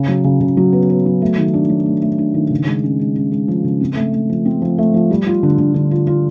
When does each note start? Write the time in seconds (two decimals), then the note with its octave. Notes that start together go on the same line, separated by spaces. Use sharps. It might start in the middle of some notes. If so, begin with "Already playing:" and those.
Already playing: C#3
0.08 F#3
0.24 C#3
0.41 C#3
0.57 F#3
0.73 B3
0.89 B3
1.06 F#3
1.22 A3
1.37 D#3
1.54 D4
1.69 F#3
1.86 A3
2.02 A3
2.18 D4
2.34 D#3
2.50 C#3
2.67 G#3
2.84 C#4
2.99 G#3
3.16 C#4
3.32 G#3
3.48 F3
3.64 C#3
3.81 C4
3.96 A3
4.12 A3
4.29 F3
4.45 C4
4.62 F3
4.78 A3
4.94 F3
5.11 G3
5.27 F4
5.43 D3
5.58 D3
5.74 D3
5.91 F4
6.07 F4